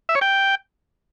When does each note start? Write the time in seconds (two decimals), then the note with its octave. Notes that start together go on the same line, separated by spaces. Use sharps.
0.09 E5
0.15 C#5
0.21 G5